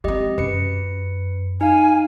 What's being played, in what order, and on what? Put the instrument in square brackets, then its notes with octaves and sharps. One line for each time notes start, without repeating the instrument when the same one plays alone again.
[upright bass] G#3 C4 [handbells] G4 D#5
[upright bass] F#2 [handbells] B4 C#7
[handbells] D#4 F5 [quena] G#5